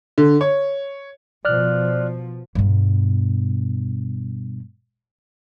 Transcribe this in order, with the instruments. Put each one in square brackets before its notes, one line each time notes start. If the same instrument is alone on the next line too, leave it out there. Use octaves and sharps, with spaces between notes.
[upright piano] D3
C#5
[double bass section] B2 F3 [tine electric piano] D5 F6 F#6
[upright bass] G2 B2